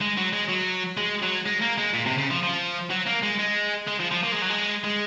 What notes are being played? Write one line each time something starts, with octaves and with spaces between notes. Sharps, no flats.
G#3
F#3
G#3
F#3
G#3
F#3
G#3
A#3
G#3
A#2
C3
C#3
F3
F3
F#3
A#3
G#3
G#3
G#3
F3
F3
A#3
G#3
F#3
G#3
G#3